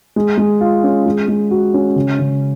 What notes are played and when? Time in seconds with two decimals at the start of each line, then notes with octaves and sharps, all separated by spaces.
0.16 G#3
0.38 G#3
0.61 F4
0.84 C#4
1.06 G#3
1.28 G#3
1.51 F#4
1.74 C#4
1.96 C#3
2.19 C#3